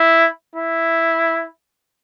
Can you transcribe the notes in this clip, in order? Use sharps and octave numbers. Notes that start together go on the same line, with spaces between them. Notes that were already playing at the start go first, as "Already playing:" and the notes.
Already playing: E4
E4